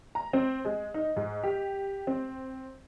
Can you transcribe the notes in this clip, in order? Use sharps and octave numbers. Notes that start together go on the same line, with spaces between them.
A#5
C4
G#3
D#4
G#2
G4
C4